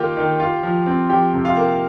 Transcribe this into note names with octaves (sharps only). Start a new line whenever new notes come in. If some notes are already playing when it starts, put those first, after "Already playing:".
Already playing: D#3 A#3 F4 G4 G5
D#3
F4
F3
C4
F3 G4 G5
C3
F4 F5
A#3